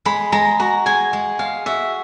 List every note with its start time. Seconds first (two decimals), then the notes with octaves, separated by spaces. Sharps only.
0.05 G#3 B5
0.32 G#3 A#5
0.60 F#4 A#5
0.86 G#3 G#5
1.13 G#3
1.39 G#3 F5
1.66 F#4 E5